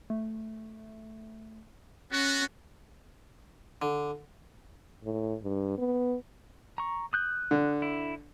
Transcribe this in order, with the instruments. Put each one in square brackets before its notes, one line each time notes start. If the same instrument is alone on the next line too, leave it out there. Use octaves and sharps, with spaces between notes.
[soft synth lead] A3
[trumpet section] B3 F#4 [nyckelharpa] C#4
[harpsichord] D3
[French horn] A2
G2
B3
[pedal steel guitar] A#5 C#6
D#6 F#6 G6
[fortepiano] D3
[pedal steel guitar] E4